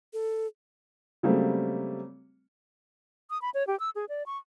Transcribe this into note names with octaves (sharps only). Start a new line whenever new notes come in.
A4
C#3 F#3 G3 A3 A#3 C4
D#6
B5
C#5
G4
E6
G#4
D5
C#6